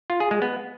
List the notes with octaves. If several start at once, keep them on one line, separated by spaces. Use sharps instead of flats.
F4
G#4
G#3
B3